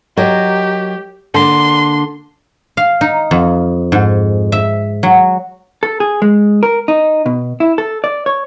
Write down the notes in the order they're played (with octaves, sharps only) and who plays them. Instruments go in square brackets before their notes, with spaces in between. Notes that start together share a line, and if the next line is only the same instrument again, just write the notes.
[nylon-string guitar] F#3 A#4 D#5 [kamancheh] G4
[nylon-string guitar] D3 A#3 [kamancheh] C6
[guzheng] F5
D#4
F2
G#2
E5
F#3
[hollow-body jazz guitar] A4
G#4
G#3
A#4
D#4
B2
E4
A4
D5
C#5